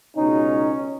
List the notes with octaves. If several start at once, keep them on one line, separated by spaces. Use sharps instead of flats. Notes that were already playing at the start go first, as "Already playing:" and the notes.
C#2 B2 C#4 D#4